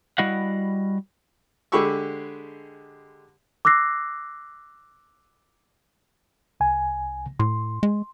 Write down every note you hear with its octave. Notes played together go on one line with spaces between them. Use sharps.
G3 E4 F#4 D#5 F5 F#5
D3 G#3 G4 B5 C#6 E6
D6 E6 F#6 A#6 C7
C2 G#5
A2 C6
G#3